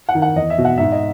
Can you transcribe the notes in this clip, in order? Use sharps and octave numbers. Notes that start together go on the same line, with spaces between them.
F#5
D#3
F#5
E2 D#5
E5
B2
F#5
G#2 E5
D#5